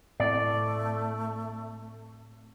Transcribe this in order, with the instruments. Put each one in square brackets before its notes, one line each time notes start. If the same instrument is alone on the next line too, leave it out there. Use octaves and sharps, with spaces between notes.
[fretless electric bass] A2 C4 [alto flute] A3 [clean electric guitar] D5